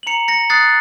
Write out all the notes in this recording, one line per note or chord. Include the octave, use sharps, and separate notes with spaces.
F#7
A#5 C#7 F7
A#6 C#7
D#6 F#6 A6 C7